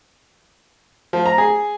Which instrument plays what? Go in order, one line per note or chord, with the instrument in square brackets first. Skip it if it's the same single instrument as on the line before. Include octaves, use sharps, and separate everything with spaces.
[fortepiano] F3
A#5
G#4